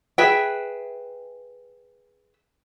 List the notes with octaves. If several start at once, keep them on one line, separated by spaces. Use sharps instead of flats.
G#4 B4 E5 G5